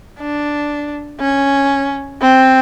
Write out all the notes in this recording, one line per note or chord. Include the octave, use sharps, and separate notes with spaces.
D4
C#4
C4